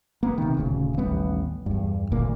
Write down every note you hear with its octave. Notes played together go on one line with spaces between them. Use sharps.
A#3 B3
C3 D#3
D#1 D2 C#3
A1 D#2 G3 B3
E2 G2
G#1 D2 A#2 A#3